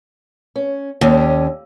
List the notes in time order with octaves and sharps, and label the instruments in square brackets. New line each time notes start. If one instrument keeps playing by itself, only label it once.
[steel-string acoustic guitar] C#4
[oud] D#2 [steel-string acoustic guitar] C#4 D4